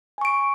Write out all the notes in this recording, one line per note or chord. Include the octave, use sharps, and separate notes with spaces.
G#5 C#6 D7